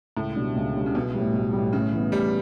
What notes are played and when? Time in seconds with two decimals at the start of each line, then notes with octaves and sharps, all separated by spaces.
0.16 C#2 A2
0.36 B2 G3 D4
0.56 C#2
0.76 B2 G3 D4
0.86 C#3
0.94 B1 B2
1.14 A2 G3
1.33 B1
1.53 A2 G3
1.73 A2 C#3
1.93 E3 B3
2.12 A2 G3